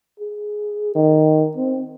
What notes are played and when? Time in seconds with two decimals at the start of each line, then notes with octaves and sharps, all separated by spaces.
0.20 G#4
0.95 D#3
1.57 C4